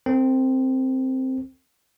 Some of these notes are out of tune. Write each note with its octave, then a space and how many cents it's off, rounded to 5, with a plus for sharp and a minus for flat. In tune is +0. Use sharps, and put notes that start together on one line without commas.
C4 +0 A#4 -45